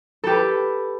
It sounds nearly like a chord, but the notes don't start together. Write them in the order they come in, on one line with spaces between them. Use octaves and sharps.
A4 G4 B4